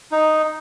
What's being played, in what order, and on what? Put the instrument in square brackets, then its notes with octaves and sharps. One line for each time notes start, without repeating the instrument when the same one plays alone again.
[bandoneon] D#4